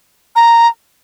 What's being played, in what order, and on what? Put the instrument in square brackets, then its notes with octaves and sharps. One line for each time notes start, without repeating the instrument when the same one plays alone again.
[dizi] A#5